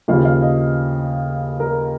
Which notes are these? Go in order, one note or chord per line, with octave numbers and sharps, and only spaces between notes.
D#2 C#3 F3 F5
F5
D#5
A#4